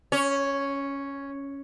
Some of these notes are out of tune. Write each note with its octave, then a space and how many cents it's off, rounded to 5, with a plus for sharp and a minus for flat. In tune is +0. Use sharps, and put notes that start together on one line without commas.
C#4 +0 C#5 +0